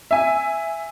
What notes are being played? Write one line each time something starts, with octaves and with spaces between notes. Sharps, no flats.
E5 G#5